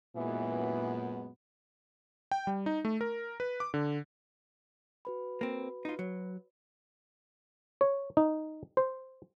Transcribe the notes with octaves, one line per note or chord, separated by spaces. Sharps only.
F#2 A#2 E3 G#3 B3
G5
G3
D#4
A3
A#4
B4
D6
D3
F#4 B4 B5
A#3 C4
D#4 F4
F#3
C#5
D#4
C5